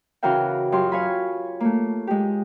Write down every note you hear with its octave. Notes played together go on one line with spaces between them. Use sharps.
C#3 E3 F#4 A#4 F5 G5
F#2 F4 G4 C6
C#5 F5 G#5 B5
A3 A#3
G#3 G4